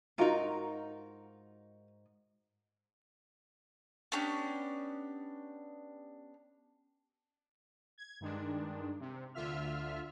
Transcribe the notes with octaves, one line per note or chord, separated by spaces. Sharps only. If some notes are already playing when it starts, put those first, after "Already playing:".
G#2 D#4 F4 F#4 A#4
B3 C#4 D4 G4
G#6
G2 D#3 G#3 D4
C3
D2 D3 F4 E5 F6